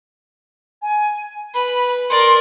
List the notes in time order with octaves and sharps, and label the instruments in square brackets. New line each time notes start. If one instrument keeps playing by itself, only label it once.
[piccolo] G#5
[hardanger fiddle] B4 [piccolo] B5
[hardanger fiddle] A#4 D5 [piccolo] C6